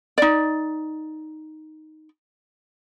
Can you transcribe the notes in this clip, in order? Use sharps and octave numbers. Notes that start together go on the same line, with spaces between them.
D#4 D5